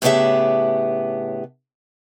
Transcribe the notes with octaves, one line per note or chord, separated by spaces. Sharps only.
A2 C#3 B3 D4 G4 E5